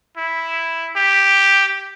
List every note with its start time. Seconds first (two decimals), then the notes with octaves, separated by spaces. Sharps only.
0.17 E4
0.96 G4